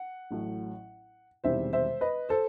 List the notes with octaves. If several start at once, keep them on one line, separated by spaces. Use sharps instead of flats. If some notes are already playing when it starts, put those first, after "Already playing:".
Already playing: F#5
A1 A2 F#3
E1 E2 C3 D#3 G3 C5 E5
C5 E5
B4 D#5
A4 C5